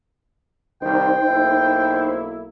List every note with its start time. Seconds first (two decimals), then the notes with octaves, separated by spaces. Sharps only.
0.82 C2 D#3 D#4 C5 G5
1.26 B1 A#3 E4